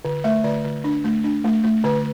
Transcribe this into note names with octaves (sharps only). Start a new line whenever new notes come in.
D3
A3 E5
D3 D5
D3
D4
A3
D4
A3
A3
D3 B4